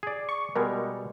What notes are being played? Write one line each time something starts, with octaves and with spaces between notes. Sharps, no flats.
G#4 D5
C#6
B2 G3 G#3 A#4